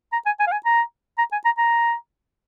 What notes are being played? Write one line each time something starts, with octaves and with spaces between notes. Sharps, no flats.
A#5
G#5
G#5
F5
G#5
A#5
A#5
G#5
A#5
A#5